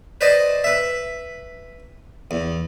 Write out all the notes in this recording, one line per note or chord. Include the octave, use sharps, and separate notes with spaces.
B4 C5 D5 D#5
B4 E5
E2